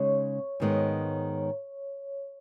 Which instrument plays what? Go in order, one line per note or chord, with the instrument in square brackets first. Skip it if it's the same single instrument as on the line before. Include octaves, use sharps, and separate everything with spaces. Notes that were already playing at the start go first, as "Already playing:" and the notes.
Already playing: [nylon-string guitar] C#3 G#3 D#4 [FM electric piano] C#5
[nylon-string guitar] G#2 D#3 G#3 B3